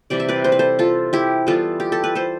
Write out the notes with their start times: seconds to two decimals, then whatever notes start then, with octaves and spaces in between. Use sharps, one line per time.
0.10 C3 E3 G3 D5
0.20 E5
0.29 B4 D5
0.44 C5
0.52 B4
0.59 A4 C5
0.79 F4 A4
1.13 E4 G4
1.47 E3 G3 B3 F4 A4
1.80 G4
1.92 A4
2.04 B4
2.15 A4 C5